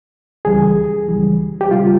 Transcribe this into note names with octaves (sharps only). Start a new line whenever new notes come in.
C#2 C#3 E3 G3 G#4
C#2 C#3 E3 G3
G4
C#3 G3 F4